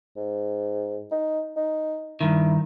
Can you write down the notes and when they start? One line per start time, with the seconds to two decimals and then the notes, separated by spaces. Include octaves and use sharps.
0.17 G#2
1.11 D#4
1.57 D#4
2.21 G2 D#3 E4